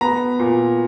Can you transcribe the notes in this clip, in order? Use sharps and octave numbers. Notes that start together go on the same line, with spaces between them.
B3 A#5
A#2